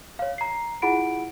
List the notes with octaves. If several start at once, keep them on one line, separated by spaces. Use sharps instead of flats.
C#5 F5
A#5 C7
E4 F4 G#4 F#5 B5 D7